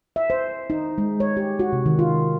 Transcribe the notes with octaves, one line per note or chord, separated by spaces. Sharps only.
E5
C5
D#4
G#3
C#5
G4
F#4
C3
D#3
F4